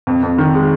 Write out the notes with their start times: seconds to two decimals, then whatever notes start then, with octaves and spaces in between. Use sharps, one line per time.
0.07 F2
0.23 F2
0.38 D#3
0.54 G#3